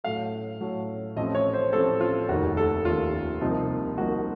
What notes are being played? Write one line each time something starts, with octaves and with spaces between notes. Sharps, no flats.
A2 F#3 A3 F5
A2 F#3 A3
A1 A2 F3 A3 C4 D#5
C#5
C5
A1 A2 F3 A3 C4 A4
F4
F1 D#2 D#3 F#4
A4
F1 D#2 D#3 F4
C2 C3 F3 A#3 D#4
C2 C3 F3 A#3 D#4 F#4